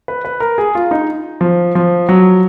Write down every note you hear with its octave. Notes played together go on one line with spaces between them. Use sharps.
B4
B4
A#4
G#4
F4
D#4
F3
F3
F#3